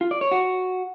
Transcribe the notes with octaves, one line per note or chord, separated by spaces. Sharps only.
F4
D5
C#5
F#4